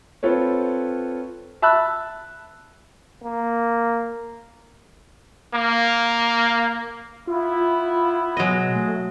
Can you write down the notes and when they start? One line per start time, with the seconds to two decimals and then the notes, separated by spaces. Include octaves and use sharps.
0.23 C4 F4 A4 B4 C#5
1.62 E5 A5 B5 E6 F#6
3.24 A#3
5.54 A#3
7.27 B3 E4 F4
8.37 B2 F#3 G#3 D#5
8.75 A3